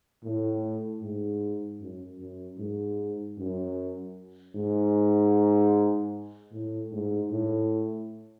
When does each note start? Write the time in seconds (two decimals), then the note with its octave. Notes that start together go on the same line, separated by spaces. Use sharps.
0.24 A2
1.02 G#2
1.81 F#2
2.20 F#2
2.59 G#2
3.38 F#2
4.56 G#2
6.52 A2
6.92 G#2
7.31 A2